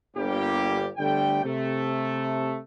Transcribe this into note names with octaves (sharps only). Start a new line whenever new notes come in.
G1 G3 A#3 G4
G1 D3 G3 A3 G5
C3 A3